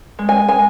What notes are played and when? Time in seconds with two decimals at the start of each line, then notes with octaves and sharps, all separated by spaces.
0.19 G#3
0.29 G#5
0.49 G#3 G#5